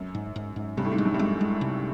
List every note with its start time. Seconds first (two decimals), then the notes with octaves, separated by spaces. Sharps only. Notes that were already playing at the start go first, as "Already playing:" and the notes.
Already playing: F#2
0.15 G#2
0.36 G#2
0.56 G#2
0.77 G2 C3
0.85 A2
0.92 G#2
0.98 G#3
1.05 F#2
1.14 G2
1.19 F#2 G#3
1.41 G#3
1.61 C3